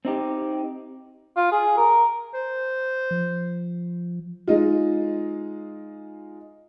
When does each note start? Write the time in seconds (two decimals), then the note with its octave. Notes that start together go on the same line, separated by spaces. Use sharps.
0.05 C4 D#4 G4
1.36 F4
1.52 G#4
1.77 A#4
2.34 C5
3.11 F3
4.47 G#3 D#4 F4